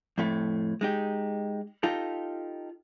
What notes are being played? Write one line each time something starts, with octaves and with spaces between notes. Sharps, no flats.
F2 A2 A3
G#3 D#4 G4
D#4 F4 G4 A4